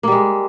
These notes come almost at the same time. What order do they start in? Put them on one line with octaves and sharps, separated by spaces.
A#3 G3 G#3